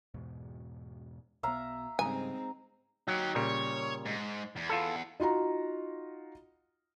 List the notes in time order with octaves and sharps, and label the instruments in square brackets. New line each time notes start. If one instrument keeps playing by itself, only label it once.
[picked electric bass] E2 G#2 B2
[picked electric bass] B1 B3 [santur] E5 F5 A#5
[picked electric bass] G#2 C#3 G3 [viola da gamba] G#3 C4 [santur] D#4 A#5 [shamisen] G#5
[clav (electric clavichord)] F#3 [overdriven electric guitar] D#4 G4
[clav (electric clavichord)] A#2 C#3 G3 [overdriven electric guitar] C#5
[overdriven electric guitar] G#2
E2
[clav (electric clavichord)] F4 A4
[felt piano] D#4 F4 F#4 A#5